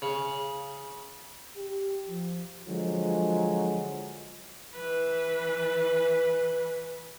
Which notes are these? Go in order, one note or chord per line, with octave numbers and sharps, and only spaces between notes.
C#3
G4
F3
D3 F3 F#3 G#3
E3 B4